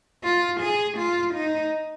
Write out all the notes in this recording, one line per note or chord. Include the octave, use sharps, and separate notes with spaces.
F4
G#4
F4
D#4